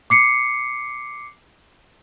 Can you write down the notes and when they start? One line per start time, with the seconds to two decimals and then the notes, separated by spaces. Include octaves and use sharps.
0.10 D6 C7 C#7